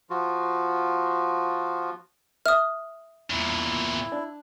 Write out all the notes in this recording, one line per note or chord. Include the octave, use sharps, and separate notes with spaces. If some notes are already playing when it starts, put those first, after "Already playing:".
F3 F4 F#4
E5 D#6 F6
E2 A#2 E4
D4